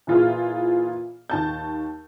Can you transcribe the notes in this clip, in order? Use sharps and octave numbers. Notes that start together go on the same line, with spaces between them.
A#2 E3 F4 G#4 E5 F6
D#2 A5 G6